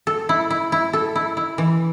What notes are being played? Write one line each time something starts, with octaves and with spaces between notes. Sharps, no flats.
A4
E4
E4
E4
A4
E4
E4
E3